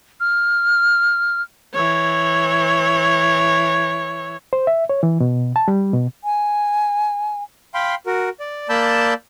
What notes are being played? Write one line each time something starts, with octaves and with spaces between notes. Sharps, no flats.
F6
E3 C#5
C5
E5
C#5
E3
B2
A5
G3
B2
G#5
F5 G5 B5 C6
F#4 A#4
D5
A#3 D5 A5 B5 E6 G6